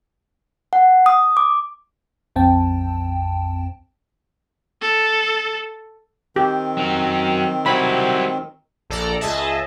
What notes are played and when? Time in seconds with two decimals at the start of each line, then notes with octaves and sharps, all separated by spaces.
0.73 F#5
1.06 D#6
1.37 D6
2.36 A#1 F2 C4 G5 A5
4.82 A4
6.36 D#3 C4 G4
6.77 F#3 A#4
7.66 F#3 G3 E4 C5 B5
8.90 A#1 A4 D5 A#5
9.21 C#2 G#4 D#5 E5 A5